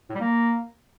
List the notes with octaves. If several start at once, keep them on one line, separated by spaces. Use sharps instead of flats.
A2
G3
A#3